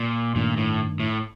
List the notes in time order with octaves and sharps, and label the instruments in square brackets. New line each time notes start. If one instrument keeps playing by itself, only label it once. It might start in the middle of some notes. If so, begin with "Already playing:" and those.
Already playing: [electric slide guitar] A#2
[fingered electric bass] G2 D#3 A3 D4 [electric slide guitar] A#2
[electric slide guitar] A2
A2